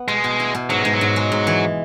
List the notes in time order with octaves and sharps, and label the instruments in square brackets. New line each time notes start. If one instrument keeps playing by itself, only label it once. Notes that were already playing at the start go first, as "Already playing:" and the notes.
Already playing: [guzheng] B3
[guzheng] B2 [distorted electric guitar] G#3
[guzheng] B2
E4
B2
[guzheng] G#2 [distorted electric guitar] F#3
[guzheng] G#2 [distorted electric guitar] G#3
[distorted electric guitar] F#3
[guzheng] G#2
G#3
G#2
E3